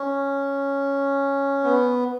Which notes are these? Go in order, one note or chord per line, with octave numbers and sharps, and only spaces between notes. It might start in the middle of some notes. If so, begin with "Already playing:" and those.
Already playing: C#4
B3